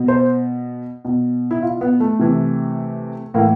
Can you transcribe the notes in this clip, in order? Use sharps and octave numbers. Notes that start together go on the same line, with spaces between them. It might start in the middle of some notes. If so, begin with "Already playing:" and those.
Already playing: B2
C5
B2
E4
F4
B3
A3
C3 E3
A2 E3 A#3